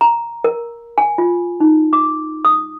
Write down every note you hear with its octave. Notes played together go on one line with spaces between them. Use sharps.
A#5
A#4
G#5
F4
D#4
D6
D#6